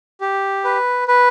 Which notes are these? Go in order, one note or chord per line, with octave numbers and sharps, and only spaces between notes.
G4
B4
B4